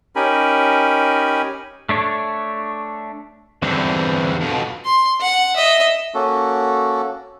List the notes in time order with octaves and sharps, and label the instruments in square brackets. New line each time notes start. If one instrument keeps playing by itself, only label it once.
[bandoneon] C#4 D#4 G4 A#4 G#5 B5
[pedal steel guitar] A3 D4 C#5
[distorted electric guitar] E2 D3 [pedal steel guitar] E3 G3 C4
[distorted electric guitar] F2 B2
[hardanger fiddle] C6
F#5
D#5 E5
[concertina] A#3 C#4 F#4 A4